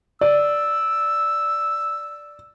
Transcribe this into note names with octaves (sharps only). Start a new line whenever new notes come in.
D5 E6